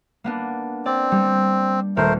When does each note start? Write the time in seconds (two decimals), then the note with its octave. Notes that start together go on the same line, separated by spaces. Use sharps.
0.24 A#3 B3 D4
0.86 C4 D5
1.12 G3
1.97 D#1 A3 A#4 C5